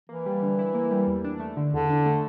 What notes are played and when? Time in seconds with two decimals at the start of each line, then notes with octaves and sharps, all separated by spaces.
0.09 E3 A#3
0.26 G3
0.42 D3
0.59 E4
0.74 A#3
0.91 G3
1.07 E2
1.24 D4
1.40 A3
1.57 D3
1.73 E2 D3
1.90 D4
2.06 A3